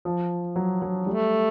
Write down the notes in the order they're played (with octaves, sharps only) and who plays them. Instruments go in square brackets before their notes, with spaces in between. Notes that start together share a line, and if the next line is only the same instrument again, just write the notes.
[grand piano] F3
F#3
F#3
[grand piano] G3 [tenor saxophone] A3